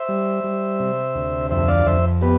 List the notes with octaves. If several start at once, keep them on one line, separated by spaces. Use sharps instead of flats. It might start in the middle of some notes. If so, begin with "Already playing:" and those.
Already playing: C5 E5
G3
G3
C3
D2
F2 C5 E5
D5 F5
F2 C5 E5
B3 G4 B4